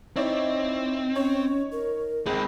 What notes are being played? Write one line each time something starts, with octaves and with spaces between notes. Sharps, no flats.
C4 D#4 E4 C#5 D5
C#4 C#5
A#4
C#2 G#3 C4 G#4 B5